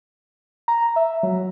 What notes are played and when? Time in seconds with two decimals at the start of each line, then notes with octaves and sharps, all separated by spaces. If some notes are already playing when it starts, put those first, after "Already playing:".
0.68 A#5
0.96 E5
1.23 F#3